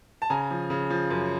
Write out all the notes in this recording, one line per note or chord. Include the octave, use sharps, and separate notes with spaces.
A5
C#3 G#5 A#5
F3
C#3
F3
F#2